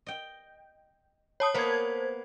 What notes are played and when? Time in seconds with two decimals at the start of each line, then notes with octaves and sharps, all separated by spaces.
0.06 D#5 G5
1.40 C#5 A5 D#6
1.54 A#3 B3 C5 D#5 G#6